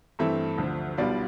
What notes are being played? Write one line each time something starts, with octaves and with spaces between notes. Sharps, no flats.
G2 E3 A3 C4 E5
D2 D3 F3
B1 B2 G3 B3 F4 D5 F5